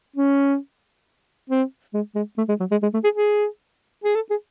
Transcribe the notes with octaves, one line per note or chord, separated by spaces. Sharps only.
C#4
C4
G#3
G#3
A3
G#3
F#3
G#3
G#3
A3
G#4
G#4
G#4
A4
G#4